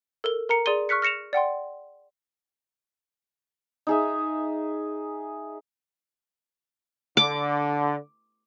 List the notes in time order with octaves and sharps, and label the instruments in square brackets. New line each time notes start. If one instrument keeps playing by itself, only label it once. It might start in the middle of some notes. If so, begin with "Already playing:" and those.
[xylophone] A4 A#4 G7
A#4 A#5 C#7
G#4 D5 C6 D#7 G7
C#6 F6 F#6 B6 C#7
F6 A#6 C#7 E7 F7
D5 F#5 G5 C6
[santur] D#4 G#4 E5
[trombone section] D3 [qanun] D6